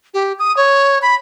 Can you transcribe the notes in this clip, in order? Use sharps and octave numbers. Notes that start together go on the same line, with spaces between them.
G4
D#6
C#5
B5